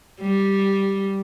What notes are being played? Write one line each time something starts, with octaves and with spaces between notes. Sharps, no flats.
G3